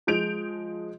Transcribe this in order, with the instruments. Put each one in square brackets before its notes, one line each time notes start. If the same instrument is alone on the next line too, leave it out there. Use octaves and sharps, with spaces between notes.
[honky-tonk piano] F3 G#3 G6 D7 F7